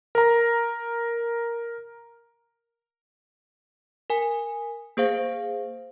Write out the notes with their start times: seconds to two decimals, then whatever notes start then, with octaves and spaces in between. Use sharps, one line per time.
0.15 A#4 A#5
4.10 A#4 G#5
4.97 A#3 G#4 C5 F5